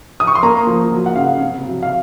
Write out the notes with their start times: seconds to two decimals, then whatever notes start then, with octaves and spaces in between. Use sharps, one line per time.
0.20 D#6
0.27 C#6
0.35 C6
0.43 A#3 A#5
0.67 F3
0.92 F#3
1.06 F#5
1.16 C#3 F5
1.40 C3
1.65 F#3
1.83 F5